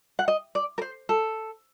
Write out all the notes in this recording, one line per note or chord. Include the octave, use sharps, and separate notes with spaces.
F#5
D#5
D5
A#4
C5
A4